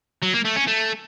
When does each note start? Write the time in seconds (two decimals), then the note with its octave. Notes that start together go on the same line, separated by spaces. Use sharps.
0.22 F#3
0.33 A#3
0.45 A3
0.56 C#4
0.67 A3